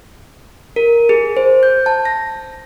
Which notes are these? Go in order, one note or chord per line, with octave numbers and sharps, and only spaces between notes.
A#4
G#4
C5
G6
A5
A#6